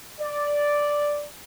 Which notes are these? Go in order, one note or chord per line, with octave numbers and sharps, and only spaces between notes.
D5